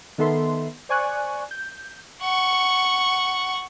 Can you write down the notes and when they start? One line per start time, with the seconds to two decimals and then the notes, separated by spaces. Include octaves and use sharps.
0.18 D#3 B3 A4 E5 C6
0.89 C5 D5 G#5 C#6 F#6
1.51 G6
2.22 F#5 C#6